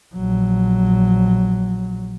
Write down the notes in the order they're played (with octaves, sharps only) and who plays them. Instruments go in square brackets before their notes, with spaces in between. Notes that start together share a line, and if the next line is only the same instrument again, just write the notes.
[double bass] A#1 F#3